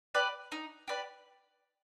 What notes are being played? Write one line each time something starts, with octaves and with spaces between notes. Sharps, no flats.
G4 B4 D5
D#4
G4 B4 D5